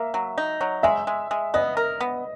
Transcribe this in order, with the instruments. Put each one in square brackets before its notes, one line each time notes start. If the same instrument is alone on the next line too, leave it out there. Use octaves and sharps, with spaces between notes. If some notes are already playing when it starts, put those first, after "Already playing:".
Already playing: [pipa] A#3 [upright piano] E5
[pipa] F#3
D#4
F#3
[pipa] G#3 [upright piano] E5
[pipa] G#3
G#3
[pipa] B3 [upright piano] D#5
[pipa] A#4
B3